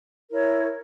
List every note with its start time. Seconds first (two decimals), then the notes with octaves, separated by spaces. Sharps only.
0.30 E4 A#4 C#5